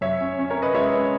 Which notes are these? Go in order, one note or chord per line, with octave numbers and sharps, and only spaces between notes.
F#2 C#5 E5
C#4
C#4
A#4 C#5
C#4
B4 D#5
G#3 C#5 E5
C#4